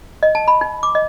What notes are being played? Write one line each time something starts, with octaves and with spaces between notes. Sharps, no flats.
D#5
A5
B5
D#4
D6
D#5